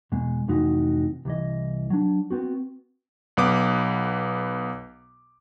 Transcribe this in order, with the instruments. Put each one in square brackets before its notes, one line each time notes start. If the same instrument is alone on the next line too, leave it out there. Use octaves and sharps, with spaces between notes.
[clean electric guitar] E2 B2 G#3
F2 A2 C3 E3 D#4 F#4
C2 E3 D#5
F#3 D4
B3 C4 F#4
[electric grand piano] B1 B3 D6